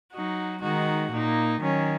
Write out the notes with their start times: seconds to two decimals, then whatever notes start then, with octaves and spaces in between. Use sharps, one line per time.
0.13 F#3 D#4 F#4
0.62 D#3 G#3 D#4 F#4
1.11 A#2 A#3 D#4
1.60 D#3 F#3 C#4